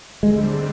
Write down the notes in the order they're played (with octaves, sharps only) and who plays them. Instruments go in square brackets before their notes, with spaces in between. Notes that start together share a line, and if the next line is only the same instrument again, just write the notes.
[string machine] D3 G3 C4 [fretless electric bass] G#3